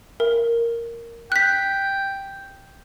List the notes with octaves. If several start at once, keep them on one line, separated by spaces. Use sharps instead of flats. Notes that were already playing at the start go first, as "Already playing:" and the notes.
A#4
G5 F#6 B6